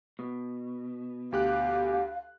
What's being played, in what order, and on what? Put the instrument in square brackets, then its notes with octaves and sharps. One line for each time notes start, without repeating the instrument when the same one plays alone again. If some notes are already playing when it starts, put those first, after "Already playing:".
[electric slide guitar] B2
[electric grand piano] D2 G4 F#6 [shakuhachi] F5